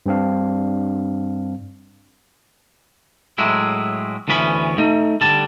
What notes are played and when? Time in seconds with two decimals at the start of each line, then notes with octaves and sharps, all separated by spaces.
0.06 G2 G3 C4 D4 F5
3.38 A2 F#3 G#3 E4
4.28 D2 E3 B3 C#4 B5
4.78 A3 D#4
5.21 D3 G3 A5